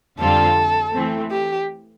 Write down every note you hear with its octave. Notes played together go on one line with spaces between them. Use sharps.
F2 D3 G3 C4 F4 A4
E3 A3 C4
G4